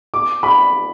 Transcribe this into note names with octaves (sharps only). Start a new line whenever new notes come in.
D6
B5